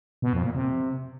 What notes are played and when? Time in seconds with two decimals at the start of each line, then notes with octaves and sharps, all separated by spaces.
0.22 B2
0.33 F2
0.44 A#2
0.55 C3